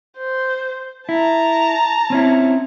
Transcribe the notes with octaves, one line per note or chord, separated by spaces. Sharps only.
C5
E4 A5 A#5
C4 C#4 E4